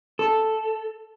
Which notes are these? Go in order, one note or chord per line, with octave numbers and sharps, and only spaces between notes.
A4